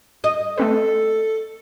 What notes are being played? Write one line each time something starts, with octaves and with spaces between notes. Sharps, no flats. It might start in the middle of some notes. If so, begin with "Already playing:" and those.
D#5
A3 C4 A4 B4